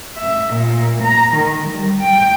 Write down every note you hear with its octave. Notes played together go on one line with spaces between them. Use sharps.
E5
A#2
A#5
D#3
G3
G5